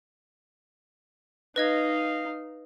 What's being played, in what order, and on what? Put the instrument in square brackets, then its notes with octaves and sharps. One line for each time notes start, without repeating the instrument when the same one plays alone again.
[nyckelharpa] D#4 F5 [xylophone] B4 D#5 G#6